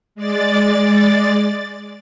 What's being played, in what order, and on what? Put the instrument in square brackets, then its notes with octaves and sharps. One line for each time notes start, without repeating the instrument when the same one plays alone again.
[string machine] G#3 D5 A6